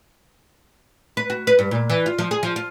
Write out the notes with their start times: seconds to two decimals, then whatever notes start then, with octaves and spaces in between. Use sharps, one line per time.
1.17 B4
1.30 F#4
1.47 B4
1.59 G2
1.71 A#2
1.90 E3
2.06 F4
2.18 F3
2.31 G#4
2.43 F3
2.56 F4